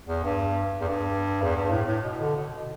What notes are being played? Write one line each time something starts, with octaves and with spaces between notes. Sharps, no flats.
E2
G2
E2
G2
E2
G2
A2
A2
B2
D3
B2